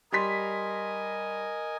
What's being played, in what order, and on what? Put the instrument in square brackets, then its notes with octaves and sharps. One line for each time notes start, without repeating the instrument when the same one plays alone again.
[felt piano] G3 C6 B6 [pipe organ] A#4 D#5 G#5